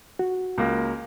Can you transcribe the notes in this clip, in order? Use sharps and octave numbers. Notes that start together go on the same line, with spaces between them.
F#4
C#2 A#3